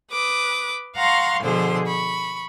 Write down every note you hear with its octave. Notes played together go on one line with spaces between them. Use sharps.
B4 D6 D#6
F5 F#5 A#5 C6 C#6
B2 D3 F3 G#4 C5 C6
B5 C#6